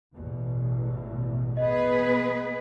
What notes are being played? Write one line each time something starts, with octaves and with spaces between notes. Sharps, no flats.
A1 E2 B2
B3 G#4 B4 D#5